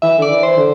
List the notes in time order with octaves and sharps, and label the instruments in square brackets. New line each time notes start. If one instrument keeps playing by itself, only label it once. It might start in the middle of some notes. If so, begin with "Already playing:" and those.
[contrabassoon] E3 [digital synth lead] E5
[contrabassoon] D3 [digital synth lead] D5
[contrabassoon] E3
[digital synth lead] C5
[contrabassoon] D3